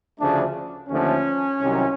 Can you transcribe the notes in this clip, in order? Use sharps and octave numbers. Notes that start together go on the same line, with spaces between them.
D2 C#3 F3 A3 D4
D#2 D3 F3 A3 C#4
C2 C3 D#3 F#3